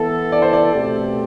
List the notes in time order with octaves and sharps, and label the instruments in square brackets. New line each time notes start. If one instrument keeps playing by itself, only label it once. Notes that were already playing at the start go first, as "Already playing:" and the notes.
Already playing: [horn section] E3 B3 E4 A4
[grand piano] D5
C5
D5
[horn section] B2 A3 C4 G4